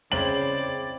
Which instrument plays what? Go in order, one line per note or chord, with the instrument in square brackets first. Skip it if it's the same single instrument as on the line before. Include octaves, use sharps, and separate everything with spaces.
[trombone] C#3 [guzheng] C4 E4 [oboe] D5 [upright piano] F#7